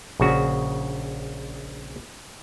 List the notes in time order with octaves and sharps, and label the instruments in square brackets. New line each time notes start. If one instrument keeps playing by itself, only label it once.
[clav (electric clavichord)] A#1 C#3 F#4